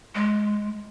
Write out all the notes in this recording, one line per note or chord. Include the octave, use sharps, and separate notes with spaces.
G#3